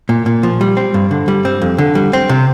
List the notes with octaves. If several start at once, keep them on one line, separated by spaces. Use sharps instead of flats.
A#2
A#2
F3
G3
C4
G2
D3
G3
C4
F2
D3
G3
C4
C3